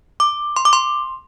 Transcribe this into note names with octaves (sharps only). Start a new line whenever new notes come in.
D6
C6
D6
C6